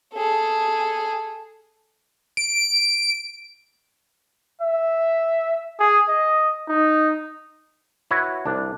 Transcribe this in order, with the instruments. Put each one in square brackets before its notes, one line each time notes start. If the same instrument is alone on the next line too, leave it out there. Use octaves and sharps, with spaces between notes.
[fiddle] G#4 A4
[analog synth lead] D7
[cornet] E5
G#4
D#5
D#4
[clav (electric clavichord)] E4 F#4 B4 C#5
C2 D4